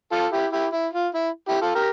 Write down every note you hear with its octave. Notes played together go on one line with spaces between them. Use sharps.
F4 A4
E4 G4
E4 G4
E4
F4
E4
E4 G4
F4 A4
G4 A#4